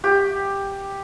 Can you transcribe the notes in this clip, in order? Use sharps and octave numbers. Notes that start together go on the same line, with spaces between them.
G4